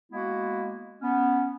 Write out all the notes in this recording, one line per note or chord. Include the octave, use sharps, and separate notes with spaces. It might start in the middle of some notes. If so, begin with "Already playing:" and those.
G#3 A#3 B3 E4 F#4
B3 C#4